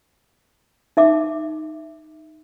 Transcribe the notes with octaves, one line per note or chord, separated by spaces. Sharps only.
D#4 E5 D6